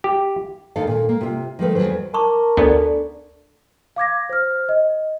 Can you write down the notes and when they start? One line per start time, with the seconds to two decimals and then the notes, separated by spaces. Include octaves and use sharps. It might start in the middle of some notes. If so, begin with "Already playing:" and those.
0.04 G4
0.76 D#2 D#3 D#4 A4 F5
0.87 A#2
1.09 A#3
1.21 C3 F4
1.59 D#3 F3 A3 B4
1.75 E2 A#2 F#3 B4 C5
2.14 A#4 A5 C#6 D6
2.57 D2 B3 D4 A4 D5
3.96 F5 D6 G#6 A#6
4.29 C5 F6
4.69 D#5